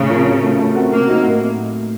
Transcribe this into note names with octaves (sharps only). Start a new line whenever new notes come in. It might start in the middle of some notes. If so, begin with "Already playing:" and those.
Already playing: A2 C#3
F3 C4 F4 A#4
F#3
A3 C#4
A3
C4 F#4 A#4
C3 A#3
F#3 C4 D#4 F#4
A2